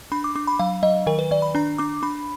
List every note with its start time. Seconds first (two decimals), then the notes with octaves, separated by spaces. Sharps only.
0.12 D4 B5
0.24 D6
0.36 D4 D6
0.47 B5
0.59 F#3 F5
0.83 F#3 D#5
1.07 D#3 A#4
1.19 B4
1.31 D#3 D5
1.42 B5
1.55 D4 A#5
1.78 D4 D6
2.03 D4 B5